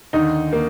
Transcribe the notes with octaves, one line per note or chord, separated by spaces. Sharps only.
D#2 D3 D#4
A#3